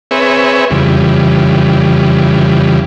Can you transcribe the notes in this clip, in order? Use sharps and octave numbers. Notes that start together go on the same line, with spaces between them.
C4 G#4 B4 C#5 E5
F2 C#3 E3 G3